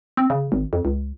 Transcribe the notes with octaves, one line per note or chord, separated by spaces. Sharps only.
C4
C#3
G#1
F2
C#2